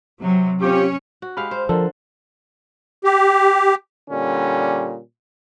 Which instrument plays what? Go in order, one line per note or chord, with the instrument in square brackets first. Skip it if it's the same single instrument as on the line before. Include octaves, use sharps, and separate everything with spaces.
[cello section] C3 F#3
[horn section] C4 F4 G4 [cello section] C#4 C#5
[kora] F#4
[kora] G#3 G4 F5 [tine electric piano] B5 F6
[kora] C5
[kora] D3 [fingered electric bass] F3 [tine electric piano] A4 A#4
[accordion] G4
[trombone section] A#2 D3 G3 C#4